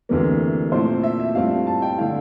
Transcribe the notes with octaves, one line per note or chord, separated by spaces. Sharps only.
D2 C3 E3 A#3
A#2 F3 A3 C4 E4 C5
E5
E5
G2 F3 A3 C4 E4 F5
A5
G5
D3 A3 E4 F5